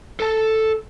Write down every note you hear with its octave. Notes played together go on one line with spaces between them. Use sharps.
A4 A5